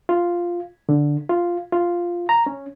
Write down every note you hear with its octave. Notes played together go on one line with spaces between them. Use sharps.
F4
D3
F4
F4
A#5
C#4